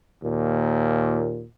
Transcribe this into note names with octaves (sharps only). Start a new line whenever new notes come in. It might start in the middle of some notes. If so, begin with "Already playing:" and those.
D#2 A#2